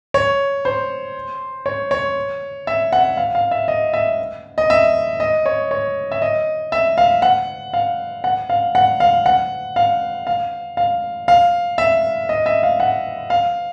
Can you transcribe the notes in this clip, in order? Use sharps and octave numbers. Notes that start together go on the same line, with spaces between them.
C#5
C5
C#5
C#5
E5
F#5
F5
F5
E5
D#5
E5
D#5
E5
D#5
C#5
C#5
E5
D#5
E5
F5
F#5
F5
F#5
F5
F#5
F5
F#5
F5
F5
F5
F5
E5
D#5
E5
F5
F#5
F5